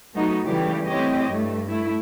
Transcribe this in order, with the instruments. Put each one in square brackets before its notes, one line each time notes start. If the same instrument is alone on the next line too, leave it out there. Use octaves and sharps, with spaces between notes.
[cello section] F#3 A3 B3 D#4 F#4
C#3 E3 G3 A3 G4
A3 C4 E4 G4 C#5 D#5
G2 A3
A3 E4